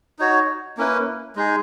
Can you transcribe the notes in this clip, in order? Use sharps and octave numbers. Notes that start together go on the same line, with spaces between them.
D#4 F#4 C#5
A#3 C#4 E4 B4
G#3 D#4 G#4